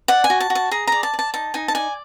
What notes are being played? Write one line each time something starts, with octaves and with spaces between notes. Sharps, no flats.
D5 F#5
G#5
F#4
A5
F#4
A5
G#4 A#5
D5 A#5
A5
D5
A5
D#4 A5
D#4 G#5
A5
D5 G#5